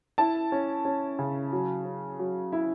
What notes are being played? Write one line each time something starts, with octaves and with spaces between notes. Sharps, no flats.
E4 A5
C#4
C#4
C#3
F#3
C#4
F#3
E4